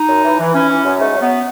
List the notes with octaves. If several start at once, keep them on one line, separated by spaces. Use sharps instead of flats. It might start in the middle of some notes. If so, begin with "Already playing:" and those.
Already playing: D#4
F#2
E3
E3
E3 C#4
E3
F#2
G#2 A3
F#3
B3